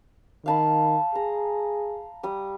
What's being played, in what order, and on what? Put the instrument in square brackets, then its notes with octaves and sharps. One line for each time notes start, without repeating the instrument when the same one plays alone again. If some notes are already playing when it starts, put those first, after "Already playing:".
[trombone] D#3 [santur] F5 A5 B5
[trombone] G#4 [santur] A#5
[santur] G3 D#6